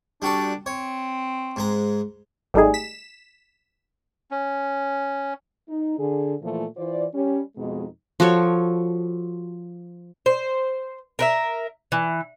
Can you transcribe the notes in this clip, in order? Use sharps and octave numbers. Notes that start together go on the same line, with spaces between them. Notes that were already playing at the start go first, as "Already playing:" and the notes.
G3 D4 F#4 A4
C4 C#5
G#2 G#3 A#5
G#1 G3 A3 D#4 G#4
B6 E7
C#4
D#4
D3 G#4
A#2 E3 F3 A3 F4
E3 F4 C5 D5
G3 C#4
F2 B2 G#3 D#4
F3 F#4 A4 C#5
C5
A#4 B4 E5
E3